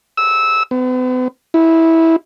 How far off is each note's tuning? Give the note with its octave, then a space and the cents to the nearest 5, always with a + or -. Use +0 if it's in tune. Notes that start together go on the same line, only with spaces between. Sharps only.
E6 -15
B3 +40
E4 -15